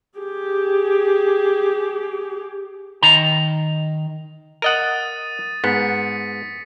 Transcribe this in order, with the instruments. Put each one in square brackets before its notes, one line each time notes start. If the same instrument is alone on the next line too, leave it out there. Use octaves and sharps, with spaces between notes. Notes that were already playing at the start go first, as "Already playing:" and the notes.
[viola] G4 G#4
[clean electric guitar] D#3 A#5
[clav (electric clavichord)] A#4 D#5 F#5 [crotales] D#6 A6 D#7
[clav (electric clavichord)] G#2 B3 [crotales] B6 C#7